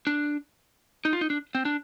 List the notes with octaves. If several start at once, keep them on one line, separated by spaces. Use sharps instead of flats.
D4
D#4
F4
D#4
D4
C4
D4